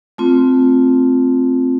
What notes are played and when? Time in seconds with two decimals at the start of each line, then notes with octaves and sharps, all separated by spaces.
0.18 A3 C4 F4